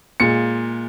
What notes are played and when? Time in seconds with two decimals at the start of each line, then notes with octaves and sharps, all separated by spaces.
0.20 A#2 G#3 C#7